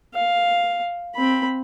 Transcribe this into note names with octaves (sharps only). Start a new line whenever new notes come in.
F5
C4 B5